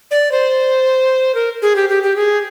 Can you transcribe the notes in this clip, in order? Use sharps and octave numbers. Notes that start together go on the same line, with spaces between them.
D5
C5
A#4
G#4
G4
G4
G4
G#4